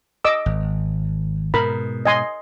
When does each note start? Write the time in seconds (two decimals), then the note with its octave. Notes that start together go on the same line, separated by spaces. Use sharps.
0.25 D#5 D6 E6
0.46 G#1
1.54 G#2 B2 A#4 B5
2.05 D#5 G#5 C6